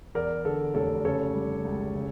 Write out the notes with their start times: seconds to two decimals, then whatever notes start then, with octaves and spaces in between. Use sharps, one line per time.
0.15 E2 A#4 D5
0.45 D3 A4
0.75 F1 A4 C#5
1.05 C#3 A4 C#5
1.34 G3
1.64 C#2
1.95 C#3